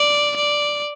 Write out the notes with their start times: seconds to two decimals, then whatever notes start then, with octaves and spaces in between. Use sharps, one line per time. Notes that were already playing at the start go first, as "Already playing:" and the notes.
Already playing: D5
0.37 D5